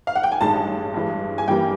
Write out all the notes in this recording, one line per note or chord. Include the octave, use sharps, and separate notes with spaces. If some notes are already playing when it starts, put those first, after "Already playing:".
F5
F#5
G5
G#5
A1 G2 D#3 G#3 A5
G2 E3 G#3
G#5
G2 E3 G3 A#3 G5